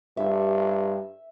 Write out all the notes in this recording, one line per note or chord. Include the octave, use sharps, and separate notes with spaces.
G2 E5